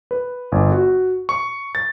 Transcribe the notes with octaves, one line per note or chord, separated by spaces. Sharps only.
B4
G1
F#4
C#6
A6